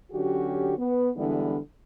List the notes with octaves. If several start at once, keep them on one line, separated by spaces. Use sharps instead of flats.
D3 F#3 C#4 F#4 G4
B3
D3 E3 G3 G#3 B3 D4